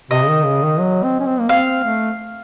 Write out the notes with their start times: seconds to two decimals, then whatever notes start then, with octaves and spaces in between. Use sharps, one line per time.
0.11 C3 D#5
0.23 C#3
0.28 D#3
0.45 C#3
0.63 D#3
0.80 F#3
1.03 C4
1.20 C#4
1.26 C4
1.39 A#3
1.49 C4 F5
1.84 A3